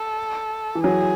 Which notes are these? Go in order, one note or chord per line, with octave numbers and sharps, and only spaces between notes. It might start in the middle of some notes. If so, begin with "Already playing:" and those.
Already playing: A4
E3
F#3 G#4